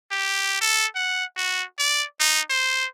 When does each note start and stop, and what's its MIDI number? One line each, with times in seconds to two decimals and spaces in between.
0.11 0.60 67
0.61 0.86 69
0.95 1.25 78
1.37 1.64 66
1.79 2.04 74
2.20 2.42 63
2.50 2.86 72